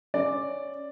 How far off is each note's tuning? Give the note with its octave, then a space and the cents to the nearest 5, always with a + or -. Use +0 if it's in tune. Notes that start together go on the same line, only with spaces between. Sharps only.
C#4 +0 D5 +0